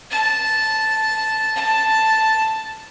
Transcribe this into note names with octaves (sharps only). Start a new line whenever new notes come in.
A5
A5